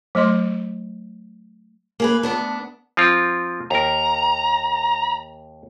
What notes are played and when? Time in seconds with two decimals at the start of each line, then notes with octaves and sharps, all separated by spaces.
0.15 F#3 A3 D#5 C6
2.00 A#3 G#4 B4
2.23 D2 B3 D4
2.97 F3 C4 F4
3.71 D#2 A#4 A#5